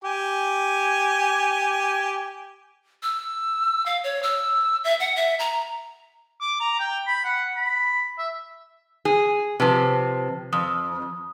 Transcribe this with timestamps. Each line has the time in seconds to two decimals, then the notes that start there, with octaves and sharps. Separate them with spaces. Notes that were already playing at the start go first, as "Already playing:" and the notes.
0.04 G4 G#5
3.03 E6
3.86 F5
4.04 C#5
4.23 E6
4.84 E5
5.00 F#5
5.16 E5
5.39 A#5
6.41 D6
6.60 A#5
6.80 G5
7.07 B5
7.24 F#5
7.57 B5
8.19 E5
9.05 G#4
9.60 C3 F3 B4 A5
10.53 F2 D#6